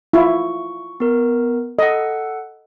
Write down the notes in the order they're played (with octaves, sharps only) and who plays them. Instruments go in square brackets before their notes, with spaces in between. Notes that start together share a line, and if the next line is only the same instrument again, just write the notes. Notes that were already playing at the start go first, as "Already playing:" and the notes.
[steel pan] E4 F4 [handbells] C#6
[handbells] B3 A#4
[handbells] A4 F#5 [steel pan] D#5